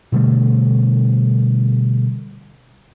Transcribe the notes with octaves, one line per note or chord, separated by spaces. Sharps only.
B2 D3 G3 A3